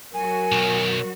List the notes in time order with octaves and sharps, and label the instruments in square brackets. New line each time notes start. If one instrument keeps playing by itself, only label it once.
[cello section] F#3 F#4 [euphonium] A#4 [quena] G#5
[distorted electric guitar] B1 D#3